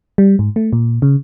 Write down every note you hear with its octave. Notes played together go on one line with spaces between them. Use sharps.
G3
G#2
A3
A#2
C#3